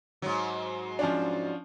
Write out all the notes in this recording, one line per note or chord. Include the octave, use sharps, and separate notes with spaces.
G#2 F#3
F3 C#4 D4